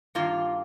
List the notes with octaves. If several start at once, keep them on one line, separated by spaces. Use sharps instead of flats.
G2 D#3 A#3 F4